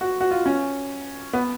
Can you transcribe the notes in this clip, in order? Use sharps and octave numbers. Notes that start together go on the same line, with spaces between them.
F#4
F#4
F4
C#4
B3